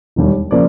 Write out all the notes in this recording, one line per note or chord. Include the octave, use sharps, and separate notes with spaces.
E1 D#2 D#3 G3
C#3 F3 A#3 C5 D5